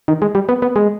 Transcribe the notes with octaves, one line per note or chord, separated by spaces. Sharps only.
D#3
G#3
G3
B3
B3
G#3